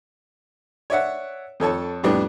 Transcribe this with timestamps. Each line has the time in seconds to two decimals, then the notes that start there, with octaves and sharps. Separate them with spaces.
0.90 C#5 D5 E5 F#5
1.60 F2 A4 C#5 A5
2.03 F2 A2 G3 B3 D4